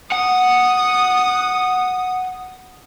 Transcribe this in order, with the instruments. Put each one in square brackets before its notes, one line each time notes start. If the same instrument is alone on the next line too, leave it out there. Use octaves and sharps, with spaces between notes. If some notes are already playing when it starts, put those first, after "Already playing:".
[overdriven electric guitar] F#5 [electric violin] D#6